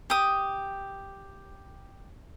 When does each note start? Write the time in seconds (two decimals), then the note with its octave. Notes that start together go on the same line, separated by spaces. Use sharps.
0.10 G4 D#6